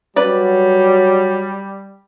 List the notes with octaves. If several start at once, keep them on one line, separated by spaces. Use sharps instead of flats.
F#3 G3 B4 D5